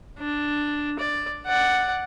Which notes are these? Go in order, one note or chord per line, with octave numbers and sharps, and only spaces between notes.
D4
D5
D5 F#5